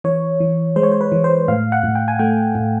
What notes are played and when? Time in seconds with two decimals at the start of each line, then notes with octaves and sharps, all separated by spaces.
0.04 E3 C#5
0.40 E3
0.76 G#3 C5
0.83 C#5
0.91 C5
1.01 B4
1.12 E3
1.24 C5
1.48 A2 F5
1.72 F#5
1.83 A2
1.95 G5
2.08 G#5
2.19 A3 G5
2.55 A2